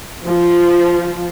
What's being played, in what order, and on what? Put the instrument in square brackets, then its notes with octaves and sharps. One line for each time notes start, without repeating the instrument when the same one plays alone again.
[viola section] F3